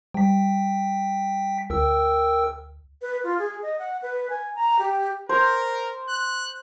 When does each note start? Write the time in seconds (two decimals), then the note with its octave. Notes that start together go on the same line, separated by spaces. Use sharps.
0.14 G3 G5 B6
1.70 D2 A#4 G5 E6
3.02 B4
3.24 F4
3.39 G#4
3.63 D#5
3.79 F#5
4.02 B4
4.30 G#5
4.55 A#5
4.79 G4
5.29 A#4 C5
6.09 F#6